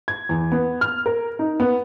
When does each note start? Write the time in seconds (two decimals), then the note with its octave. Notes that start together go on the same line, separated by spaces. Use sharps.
0.08 G#6
0.29 E2
0.52 B3
0.81 F6
1.06 A#4
1.39 D#4
1.60 B3